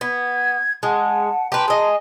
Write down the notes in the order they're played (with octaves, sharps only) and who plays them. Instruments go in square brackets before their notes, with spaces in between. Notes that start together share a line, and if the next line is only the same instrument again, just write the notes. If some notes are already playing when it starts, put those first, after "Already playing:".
[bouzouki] B3 [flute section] G#6
[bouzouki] G#3 [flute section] F#5 A5
[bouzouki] G4 B4 [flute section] A5 A#5 C6
[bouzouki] G#4 D#5